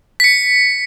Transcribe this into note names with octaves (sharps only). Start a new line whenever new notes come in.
B6 C#7